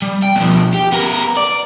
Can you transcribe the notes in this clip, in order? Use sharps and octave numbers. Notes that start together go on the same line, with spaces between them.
G3
G5
B2 F3
G4
B3 A#4
D5